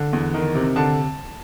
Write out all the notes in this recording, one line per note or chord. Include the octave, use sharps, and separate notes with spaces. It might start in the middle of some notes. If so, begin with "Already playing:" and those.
Already playing: D3
E2
D#3
C3
D3 A5